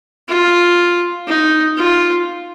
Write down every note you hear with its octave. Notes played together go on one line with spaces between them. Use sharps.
F4
D#4
F4